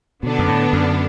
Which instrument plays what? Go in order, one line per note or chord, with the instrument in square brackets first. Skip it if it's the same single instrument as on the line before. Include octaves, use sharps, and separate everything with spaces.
[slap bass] B2 [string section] D3 B3 D4
[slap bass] F#2
A2
F#2